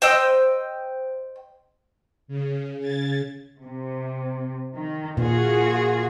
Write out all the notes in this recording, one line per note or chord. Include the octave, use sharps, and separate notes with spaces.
C5 D#5 G5 E6
C#3
C#3 G#6 A6
C3
D#3
A#2 F4 F#4 G#4